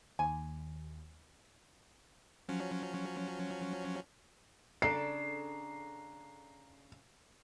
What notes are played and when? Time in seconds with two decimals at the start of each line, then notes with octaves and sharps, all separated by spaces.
0.19 D#2 G#5
2.49 F3 F#3 C#4
4.82 C#3 D4 A4 A#5 C7